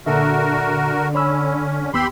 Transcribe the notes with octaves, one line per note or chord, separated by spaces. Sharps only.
A#2 D3 F#4 A4 A#4 E5
C#4 C#5 B5 E6
D#2 B3 G4 B5 C6 E6